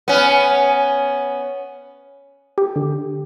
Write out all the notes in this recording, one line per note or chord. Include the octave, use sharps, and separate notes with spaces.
B3 C#4
G4
D3